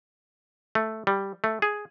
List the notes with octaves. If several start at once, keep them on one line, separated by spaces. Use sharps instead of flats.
A3
G3
A3
G#4